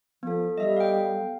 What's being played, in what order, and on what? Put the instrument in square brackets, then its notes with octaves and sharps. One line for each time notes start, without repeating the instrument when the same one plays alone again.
[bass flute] F3 [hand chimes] B3 A4
[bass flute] G3 [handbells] D#5 E5
[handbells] F5 G5